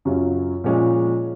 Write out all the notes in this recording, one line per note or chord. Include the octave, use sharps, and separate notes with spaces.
F#2 C#3 F#3 C#4 F4
A#2 F3 G#3 C#4 F4